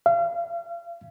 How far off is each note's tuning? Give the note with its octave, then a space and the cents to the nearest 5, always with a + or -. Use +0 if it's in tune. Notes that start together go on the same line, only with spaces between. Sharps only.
F5 -35